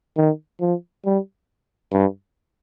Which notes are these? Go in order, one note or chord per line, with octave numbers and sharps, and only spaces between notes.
D#3
F3
G3
G2